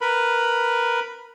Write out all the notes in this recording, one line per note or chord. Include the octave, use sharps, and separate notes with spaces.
A#4 B4 B5